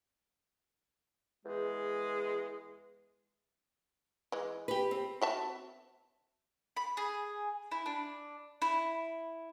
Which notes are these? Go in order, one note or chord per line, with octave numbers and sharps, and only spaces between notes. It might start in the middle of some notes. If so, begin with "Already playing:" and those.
E2 G#3
E3 G#3
G4 B4
C4
F#4 E5 A5
B5
G#4
E4
D4
E4